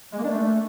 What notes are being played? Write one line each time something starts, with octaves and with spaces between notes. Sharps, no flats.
G#3
A#3
D4
A3